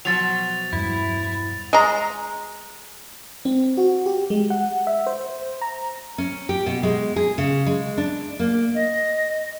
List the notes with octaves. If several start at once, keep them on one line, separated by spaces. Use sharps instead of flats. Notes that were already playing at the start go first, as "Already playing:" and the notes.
B2 F3 F#3 A6 F7
E2 G2 G3 E4
G#3 A#5
C4
F#4
G4
G#3
F#5
E5
C5
A#5
C#4
G4
B2
G#3
G#4
C#3
G#3
D4
A#3
D#5